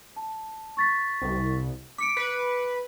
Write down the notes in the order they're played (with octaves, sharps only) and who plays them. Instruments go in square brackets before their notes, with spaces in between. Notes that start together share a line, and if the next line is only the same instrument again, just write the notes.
[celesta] A5
C#6 A6 B6
[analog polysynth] C2
[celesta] D6 C#7 D7 [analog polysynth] B6
[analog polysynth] B4